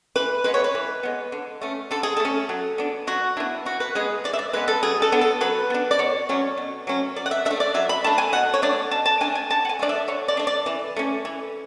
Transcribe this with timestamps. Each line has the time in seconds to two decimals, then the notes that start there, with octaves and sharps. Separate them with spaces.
0.16 E3 B4
0.44 G#3 B3 B4
0.54 C#5
0.64 B4
0.75 E3
1.03 G#3 B3
1.32 D3
1.61 A3 C#4
1.91 D3 A4
2.03 G#4
2.17 A3 A4
2.25 C#4
2.49 F#3
2.78 B3 D4
3.07 F#3 F#4
3.37 B3 D4 E4
3.65 E3 F#4
3.80 B4
3.95 G#3 B3 G#4
4.24 E3 D5
4.33 E5
4.39 D5
4.53 G#3 B3 B4
4.68 A4
4.83 F#3 G#4
5.02 A4
5.12 B3 D4
5.21 A4
5.41 F#3 B4
5.70 B3 D4
5.91 D5
5.99 B2 C#5
6.29 F#3 A3 C#4
6.57 B2
6.87 F#3 A3 C#4
7.16 F#3 D5
7.26 F#5
7.31 E5
7.45 D4 E5
7.51 A3
7.60 D5
7.74 F#3 E5
7.89 B5
8.04 A3 D4 A5
8.18 G#5
8.33 B2 F#5
8.54 C#5
8.62 A3 D4 D5
8.91 B2 A5
9.06 A5
9.21 A3 D4 G#5
9.35 G#5
9.50 D3 A5
9.65 F#5
9.69 G#5
9.79 A3 D4 D5
9.89 E5
10.08 D3 C#5
10.28 D5
10.37 A3 D4
10.47 D5
10.66 E3
10.96 A3 C#4
11.25 E3